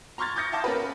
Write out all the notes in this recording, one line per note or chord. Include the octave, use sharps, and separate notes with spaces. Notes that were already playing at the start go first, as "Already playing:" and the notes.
A#5 C6 C#6 F6 G#6 A6
D6 D#6 G6 A6 A#6 C#7
E5 F5 A5 D6
C#4 A#4 B4